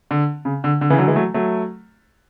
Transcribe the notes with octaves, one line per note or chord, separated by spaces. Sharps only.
D3
C#3
D3
D3
C#3 E3
D3 F#3
E3 G#3
F#3 A3
F#3 A3